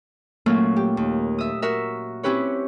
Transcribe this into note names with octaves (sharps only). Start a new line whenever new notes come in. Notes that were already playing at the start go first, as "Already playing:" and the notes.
A#2 F#3 A3 A#3 C#4 F4
G4
D#2
E5 D#6
F#4 A#4 E5
C4 C#4 E4 G4 B4 C#5